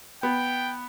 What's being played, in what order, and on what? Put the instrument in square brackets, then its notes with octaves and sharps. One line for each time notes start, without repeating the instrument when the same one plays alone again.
[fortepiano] B3 [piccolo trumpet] G5